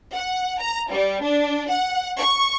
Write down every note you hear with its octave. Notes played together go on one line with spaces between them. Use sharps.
F#5
A#5
G3
D4
F#5
C#6